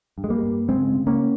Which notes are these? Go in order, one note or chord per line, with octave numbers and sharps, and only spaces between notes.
G2
G#3
G3 A#3
G2
C#3 G#3 C4
C#3
A#3 C#4